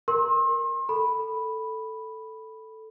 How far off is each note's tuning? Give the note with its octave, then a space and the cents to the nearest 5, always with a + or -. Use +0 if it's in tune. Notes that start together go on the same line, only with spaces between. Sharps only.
A#4 +0 C6 +40
A4 +0 B5 +0